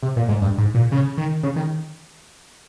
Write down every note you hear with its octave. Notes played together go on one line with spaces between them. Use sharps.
C3
A#2
G#2
G2
G#2
A#2
C#3
D#3
C#3
D#3